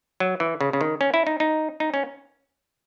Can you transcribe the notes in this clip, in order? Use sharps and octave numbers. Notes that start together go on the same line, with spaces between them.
F#3
E3
C#3
C#3
D#3
C#4
E4
D#4
D#4
D#4
C#4